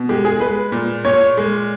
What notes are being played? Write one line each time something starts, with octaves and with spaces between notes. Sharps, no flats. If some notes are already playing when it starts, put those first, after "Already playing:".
Already playing: B2
G#3 G4
G#4
G#3 B4
A#2
A#2 C#5
G#3